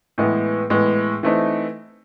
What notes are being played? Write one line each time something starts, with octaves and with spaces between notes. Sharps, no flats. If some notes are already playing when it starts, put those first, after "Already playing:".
A2 E3 G#3 B3
A2 E3 G#3 B3
E3 A3 C4 D#4